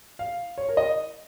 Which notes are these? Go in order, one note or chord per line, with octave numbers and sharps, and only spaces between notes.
F5
C#5
A#4
D#5